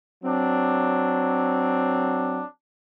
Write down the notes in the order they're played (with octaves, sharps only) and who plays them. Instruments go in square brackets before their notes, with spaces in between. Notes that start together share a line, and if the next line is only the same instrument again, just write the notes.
[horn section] F#3 C4 D4